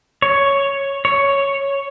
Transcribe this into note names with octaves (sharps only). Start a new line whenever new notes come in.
C#5
C#5